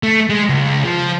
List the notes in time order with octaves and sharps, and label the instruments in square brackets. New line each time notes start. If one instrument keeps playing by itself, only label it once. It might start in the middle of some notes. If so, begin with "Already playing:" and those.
[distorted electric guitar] A3
G#3
C#2
F3